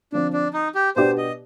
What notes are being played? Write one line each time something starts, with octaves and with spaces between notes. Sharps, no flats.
D3 F3 C4 D4
D4
D#4
G4
B2 B3 D4 G4 C5 D5
D#5